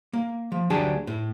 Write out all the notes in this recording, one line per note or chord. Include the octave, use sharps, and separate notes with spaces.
A#3
F3
D2 F#3 D4 G4 G#4 A5
A2